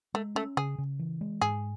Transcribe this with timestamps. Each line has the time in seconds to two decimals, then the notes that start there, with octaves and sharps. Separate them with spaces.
0.14 G#3 A3
0.35 A3 C#4
0.57 C#3 G#4
0.78 C#3
0.99 E3
1.21 G#3
1.41 G#2 G#4